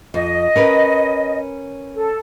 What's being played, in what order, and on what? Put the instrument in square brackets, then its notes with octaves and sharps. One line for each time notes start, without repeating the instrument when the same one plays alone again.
[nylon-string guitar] F2 [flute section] D#5
[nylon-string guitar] C#4 A#4 B4
[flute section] A4